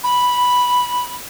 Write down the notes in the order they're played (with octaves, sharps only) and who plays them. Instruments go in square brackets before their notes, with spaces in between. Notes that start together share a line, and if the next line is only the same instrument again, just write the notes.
[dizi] B5